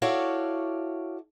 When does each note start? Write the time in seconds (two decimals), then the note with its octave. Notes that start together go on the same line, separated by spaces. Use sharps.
0.02 E4 F#4 A4 C#5 D5 F5